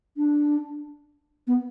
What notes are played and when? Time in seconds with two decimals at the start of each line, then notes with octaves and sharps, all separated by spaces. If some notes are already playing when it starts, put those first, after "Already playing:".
0.17 D4
1.47 B3